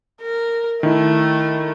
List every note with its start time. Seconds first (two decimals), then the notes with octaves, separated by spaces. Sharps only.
0.22 A#4
0.83 D#3 A3 E4